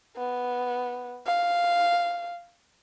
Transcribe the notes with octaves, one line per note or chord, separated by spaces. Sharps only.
B3
F5